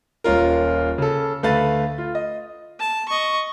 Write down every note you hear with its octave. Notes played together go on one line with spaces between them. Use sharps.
D#1 C#4 F4 A#4
C#3 A4
D2 A3 B4 F5 A6
F4
D#5
A5
D#5 C#6